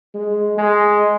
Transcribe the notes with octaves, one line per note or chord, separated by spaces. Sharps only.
G#3
G#3